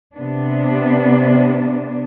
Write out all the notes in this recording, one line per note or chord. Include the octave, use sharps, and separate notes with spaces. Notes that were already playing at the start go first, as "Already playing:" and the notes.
C3 B3 D4